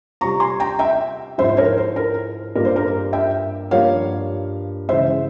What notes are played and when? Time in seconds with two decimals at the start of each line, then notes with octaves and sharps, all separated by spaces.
0.21 C3 G3 C4 F4 A#5 C#6
0.40 G#5 C6
0.60 G5 A#5
0.79 E5 G5
1.38 G#2 F3 G#3 E4 C5 E5
1.49 C5
1.57 A#4 C#5
1.78 C5
1.96 A#4
2.55 G2 G3 A#3 F4 A#4
2.65 C5
2.76 A#4
3.13 E5 G5
3.71 G2 F3 A#3 C#5 F5
4.89 C#3 E3 G#3 C5 E5